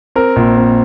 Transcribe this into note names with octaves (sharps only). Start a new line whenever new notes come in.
C4 A#4
A#1
C4